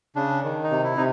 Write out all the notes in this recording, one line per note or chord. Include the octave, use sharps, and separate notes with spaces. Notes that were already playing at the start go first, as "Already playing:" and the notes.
C#3 D4
D#3
D#4
C3
E4
C3 D#4